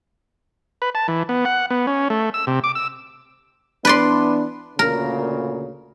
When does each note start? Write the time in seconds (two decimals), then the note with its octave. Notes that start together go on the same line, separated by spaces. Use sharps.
0.82 B4
0.95 A5
1.08 E3
1.29 B3
1.45 F#5
1.70 B3
1.87 C#4
2.10 A3
2.34 E6
2.47 C3
2.64 D6
2.75 E6
3.85 E3 B3 D4 B4 D5 C6
4.79 D2 A#2 C#3 A#4